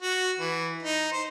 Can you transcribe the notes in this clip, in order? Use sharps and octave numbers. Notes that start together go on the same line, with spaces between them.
F#4
E3
D#4
C5